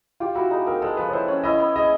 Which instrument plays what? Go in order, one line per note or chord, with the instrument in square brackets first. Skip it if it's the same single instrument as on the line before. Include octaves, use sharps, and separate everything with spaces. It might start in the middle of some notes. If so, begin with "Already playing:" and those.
[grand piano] F4 [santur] G4
[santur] E4 [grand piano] F#4
[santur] D#4 [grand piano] G#4
[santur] C4 [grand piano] A#4
[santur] G#3 [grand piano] A4
[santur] F3 [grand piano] B4
[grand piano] C#5
[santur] E4 [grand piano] C5
[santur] C#4
[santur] E4 [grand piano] D#5
[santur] B3
[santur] G#4 [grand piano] D#5